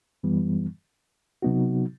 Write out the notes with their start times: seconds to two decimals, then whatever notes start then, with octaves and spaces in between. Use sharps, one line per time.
0.23 F#2 E3 G3 B3
1.42 C3 F#3 B3 D#4 F#4